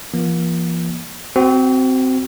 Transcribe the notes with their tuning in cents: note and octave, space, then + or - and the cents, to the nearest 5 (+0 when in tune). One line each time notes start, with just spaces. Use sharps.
F3 -40 A#3 +35
C4 -10 F#4 +30